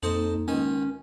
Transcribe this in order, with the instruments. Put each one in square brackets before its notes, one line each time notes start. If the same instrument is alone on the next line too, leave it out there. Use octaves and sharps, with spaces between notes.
[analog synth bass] F2 [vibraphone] A#3 D#4 [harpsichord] A4 C5 D#5
[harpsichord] C#2 D#3 G#5 [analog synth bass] C#4